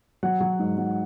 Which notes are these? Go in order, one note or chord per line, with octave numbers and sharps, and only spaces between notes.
F#3 F#5
F#3
G#2
F#3